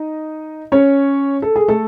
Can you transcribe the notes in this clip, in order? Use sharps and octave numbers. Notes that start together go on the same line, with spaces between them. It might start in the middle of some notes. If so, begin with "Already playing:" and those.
Already playing: D#4 D#5
C#4 C#5
A4
G#4
A3 A4